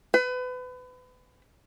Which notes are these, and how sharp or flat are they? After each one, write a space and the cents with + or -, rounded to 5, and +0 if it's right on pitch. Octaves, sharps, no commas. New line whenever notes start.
B4 +30